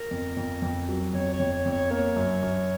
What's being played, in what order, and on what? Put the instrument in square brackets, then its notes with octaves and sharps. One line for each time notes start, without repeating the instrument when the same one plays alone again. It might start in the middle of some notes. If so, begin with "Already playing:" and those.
Already playing: [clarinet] A#4
[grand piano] F2
F2
F2
F#3
[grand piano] F2 [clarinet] C#5
[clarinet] C#5
[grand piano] F2
[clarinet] C#5
[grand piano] F2
[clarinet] C#5
[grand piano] A#3 [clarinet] C#5
[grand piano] F#2
F#2